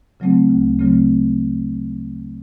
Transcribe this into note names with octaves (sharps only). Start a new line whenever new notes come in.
C#3 F#3 A3 C4
D2
C#3 F#3 A3 C4